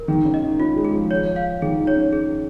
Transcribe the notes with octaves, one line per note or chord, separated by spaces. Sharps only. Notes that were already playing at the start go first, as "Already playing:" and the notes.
Already playing: A#4
D#3 G#4
C#3
D#5
D#4
C#4 F4
G#3
G#4
F3
C#5
F5
D#3 G#4
D#4
C#5
C#4
G#4